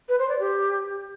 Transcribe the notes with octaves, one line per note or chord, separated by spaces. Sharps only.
B4
C5
D5
G4